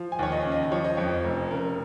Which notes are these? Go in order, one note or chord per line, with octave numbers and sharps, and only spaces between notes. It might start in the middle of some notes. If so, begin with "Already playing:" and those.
Already playing: F3
G#5
D#2 C#5
D#5
C#3
D#5
F3 C#5
D#5
F2 C#5
F1
C#3 A#4